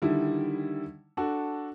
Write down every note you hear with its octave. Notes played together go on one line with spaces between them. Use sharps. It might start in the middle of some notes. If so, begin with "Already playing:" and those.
D3 D#3 G3 E4
D4 F#4 A4